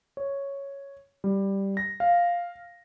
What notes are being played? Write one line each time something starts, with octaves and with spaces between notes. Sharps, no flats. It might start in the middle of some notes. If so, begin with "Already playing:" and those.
C#5
G3
A#6
F5